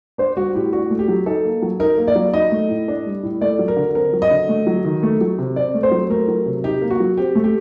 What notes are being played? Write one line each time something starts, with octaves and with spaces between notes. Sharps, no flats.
D4 C5
G3 F#4
A2 G4
D4 F#4
A3
G4
F#3
D#4 A4
A#3
F#3
D#4 A#4
A#3
D5
F#3
D#4 D#5
A3
A2
D4
G3
A2
A3 D5
F#3
A#4
D3
C4 A#4
F#3
D#5
D3
A3
F#3
D#3
A3
F#3
C3
C4 D5
A3
C5
F#3
A3 A#4
F#3
C3
D#4 G4
A#3
F#4
F#3
C4 G4
A3
G4